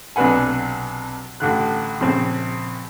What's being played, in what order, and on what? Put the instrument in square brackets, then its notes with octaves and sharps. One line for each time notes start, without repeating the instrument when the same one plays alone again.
[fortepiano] B1 C3 D4 B4 F#5 G#5
A1 D3 F#6
A#1 C#3 C4